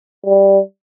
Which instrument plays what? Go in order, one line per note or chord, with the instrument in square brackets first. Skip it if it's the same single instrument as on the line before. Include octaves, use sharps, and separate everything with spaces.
[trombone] G3